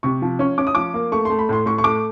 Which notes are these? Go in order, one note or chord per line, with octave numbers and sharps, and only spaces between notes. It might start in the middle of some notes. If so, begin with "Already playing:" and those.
C3 C#6
F3
C#4 C#6
C#4 D6
D#6
F3 D6
A#3
A3 C#6
A3 C6
B5
A2 C6
A2 C#6
C#6
A3 D6